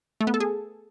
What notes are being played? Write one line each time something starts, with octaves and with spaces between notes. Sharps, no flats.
A3
B3
A4
G#4